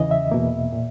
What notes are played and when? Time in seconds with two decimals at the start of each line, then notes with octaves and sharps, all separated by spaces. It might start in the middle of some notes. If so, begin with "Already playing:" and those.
Already playing: E2 C#3 E3 D#5
0.11 E5
0.31 E2 B2 A#3
0.72 A#2